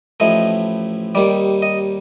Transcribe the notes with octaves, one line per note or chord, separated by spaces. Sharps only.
A1 A2 F3 A3 D#5
D#2 D#3 G3 D5
D#5